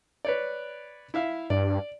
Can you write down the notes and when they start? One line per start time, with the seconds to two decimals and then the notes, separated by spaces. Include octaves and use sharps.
0.25 B4 C#5 D5
1.14 E4 E5 F5
1.50 G2 D5